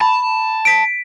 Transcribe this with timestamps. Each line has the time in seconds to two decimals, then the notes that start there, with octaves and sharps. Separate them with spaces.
0.01 A5 B5
0.65 B6 D7